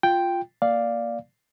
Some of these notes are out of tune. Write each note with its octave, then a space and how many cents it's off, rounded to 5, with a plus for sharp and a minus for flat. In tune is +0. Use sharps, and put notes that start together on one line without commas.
F4 +0 G5 +0
A#3 +0 D5 +0 F5 +0